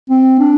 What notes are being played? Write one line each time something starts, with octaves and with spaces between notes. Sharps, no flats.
C4
D4